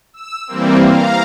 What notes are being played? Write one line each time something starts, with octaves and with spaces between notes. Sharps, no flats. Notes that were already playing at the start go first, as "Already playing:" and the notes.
E6
E3 G3 A#3 C4
F5 A#5